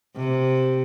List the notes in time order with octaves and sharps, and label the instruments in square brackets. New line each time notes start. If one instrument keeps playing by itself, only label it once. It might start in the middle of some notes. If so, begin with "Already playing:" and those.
[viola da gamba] C3